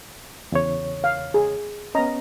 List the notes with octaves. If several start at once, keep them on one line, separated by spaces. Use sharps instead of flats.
E2 C#3 C#5
F5
G#4
B3 C#4 D#5 A#5